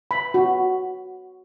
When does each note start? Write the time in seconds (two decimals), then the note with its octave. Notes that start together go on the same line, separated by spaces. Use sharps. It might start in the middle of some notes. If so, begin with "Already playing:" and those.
0.11 B5
0.34 F#4